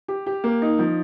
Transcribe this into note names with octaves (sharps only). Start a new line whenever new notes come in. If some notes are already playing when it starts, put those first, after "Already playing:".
G4
G4
A#3
D#4
F3